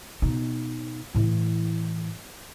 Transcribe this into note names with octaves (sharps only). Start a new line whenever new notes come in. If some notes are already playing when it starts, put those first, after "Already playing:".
B2 D#4
A2 E3